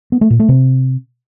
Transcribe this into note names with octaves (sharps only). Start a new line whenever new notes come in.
B3
A3
A#2
A3
C3